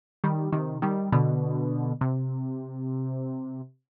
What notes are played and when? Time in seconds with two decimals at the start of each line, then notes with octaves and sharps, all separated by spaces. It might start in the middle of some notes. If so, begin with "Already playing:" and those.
0.24 D#3 G3
0.52 C3 D#3
0.82 D#3 G3
1.12 B2 D3
2.01 C3